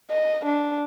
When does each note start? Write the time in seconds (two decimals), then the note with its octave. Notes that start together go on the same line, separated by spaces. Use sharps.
0.11 D#5
0.45 D4